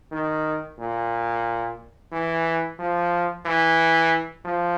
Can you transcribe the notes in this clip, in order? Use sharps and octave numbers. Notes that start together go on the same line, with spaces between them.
D#3
A#2
E3
F3
E3
F3